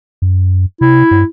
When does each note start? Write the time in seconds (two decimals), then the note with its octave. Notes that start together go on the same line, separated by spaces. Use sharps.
0.22 F#2
0.81 C3 E4
1.11 G2